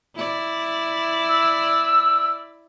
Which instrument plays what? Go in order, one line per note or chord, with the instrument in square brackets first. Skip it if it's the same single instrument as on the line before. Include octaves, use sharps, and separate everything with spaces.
[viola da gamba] E4 D5
[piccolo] E6